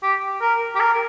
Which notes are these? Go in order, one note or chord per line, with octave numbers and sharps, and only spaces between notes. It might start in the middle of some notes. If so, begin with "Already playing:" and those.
G4
A#4
G4
A#4